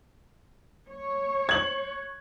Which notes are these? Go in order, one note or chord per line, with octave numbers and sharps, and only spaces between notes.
C#5
G#6 F#7